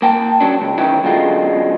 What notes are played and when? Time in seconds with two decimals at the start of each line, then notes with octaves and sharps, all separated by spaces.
0.02 A#3 G5 A5
0.40 F#3 C#4 D4
0.61 C#2
0.78 B1 D#3 E3 C#4 E4 G5
1.03 F#2 B2 D3 G#3 F4